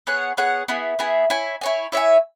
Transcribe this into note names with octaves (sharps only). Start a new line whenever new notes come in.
B3 G#4 C#5 F#5
B3 G#4 C#5 F#5
B3 E4 G#4
B3 E4 G#4
E4 C#5 G#5
E4 C#5 G#5
E4 C#5 E5 G#5